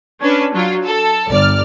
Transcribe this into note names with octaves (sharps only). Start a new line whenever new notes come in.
C#4 D4 B4
F#3 F4
A4
G1 D5 F6